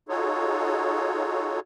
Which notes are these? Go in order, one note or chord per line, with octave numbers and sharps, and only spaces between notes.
D#4 F4 F#4 G#4 A4 C#5